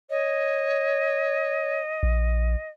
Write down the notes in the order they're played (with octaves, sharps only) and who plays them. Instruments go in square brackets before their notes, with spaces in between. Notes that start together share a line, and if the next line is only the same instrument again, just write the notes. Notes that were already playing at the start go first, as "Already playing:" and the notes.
[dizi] C#5 [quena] D#5
[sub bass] A#1